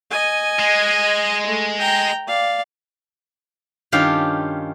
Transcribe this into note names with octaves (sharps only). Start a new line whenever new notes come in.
D#5 G#5
G#3
A3
G5 A#5
D5 F5
G2 D#3 C#4 F4 G4 F5